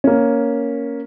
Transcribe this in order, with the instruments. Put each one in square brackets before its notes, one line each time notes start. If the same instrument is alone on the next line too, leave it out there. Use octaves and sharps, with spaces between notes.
[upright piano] A#3 C#4